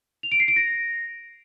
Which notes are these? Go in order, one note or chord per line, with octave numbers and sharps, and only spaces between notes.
F7
D7
C7
D7
A#6